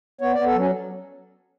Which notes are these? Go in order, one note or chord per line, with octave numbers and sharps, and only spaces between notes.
B3 C#5
B3 D5
A4
F#3 C#4